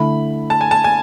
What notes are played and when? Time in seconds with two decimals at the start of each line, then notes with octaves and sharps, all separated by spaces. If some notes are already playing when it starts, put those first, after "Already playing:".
Already playing: D3 A3 E4 B5
0.50 A5
0.61 G#5
0.71 A5
0.84 G#5